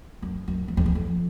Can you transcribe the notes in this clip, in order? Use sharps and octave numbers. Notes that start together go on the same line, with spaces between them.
F#2
F#2
E2
F2
E2
F2